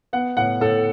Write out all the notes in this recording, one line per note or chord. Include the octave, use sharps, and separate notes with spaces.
B3 F#5
A2 F#5
A2 A4